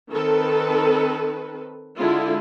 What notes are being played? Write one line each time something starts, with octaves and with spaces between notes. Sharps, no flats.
D#3 C4 A4 B4
D3 G#3 E4 F4